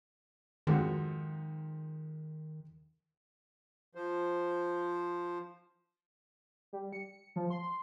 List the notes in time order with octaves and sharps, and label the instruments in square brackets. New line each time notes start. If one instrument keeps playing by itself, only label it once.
[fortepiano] F2 G#2 F#4 [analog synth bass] D#3
[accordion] F3 C5
[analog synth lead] G3
C#7
F3
C6